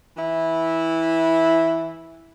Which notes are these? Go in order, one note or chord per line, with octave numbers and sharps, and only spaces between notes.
E3 E4